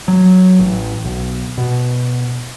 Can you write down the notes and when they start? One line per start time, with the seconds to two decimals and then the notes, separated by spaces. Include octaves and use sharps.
0.08 F#3
0.60 A1
1.05 B1
1.58 B2